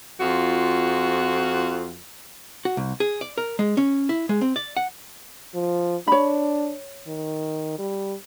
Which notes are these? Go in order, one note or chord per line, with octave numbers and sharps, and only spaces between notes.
F2 F4 F#4
F#4
C2
G#4
D5
A#4
G#3
C#4
E4
G#3
C4
D5
F#5
F3
D4 C#5 B5
D#3
G3